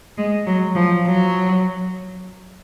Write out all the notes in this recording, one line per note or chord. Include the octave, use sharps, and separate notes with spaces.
G#3
F#3
F3
F#3